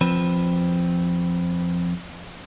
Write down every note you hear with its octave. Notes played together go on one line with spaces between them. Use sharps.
F2 F3 C4 B4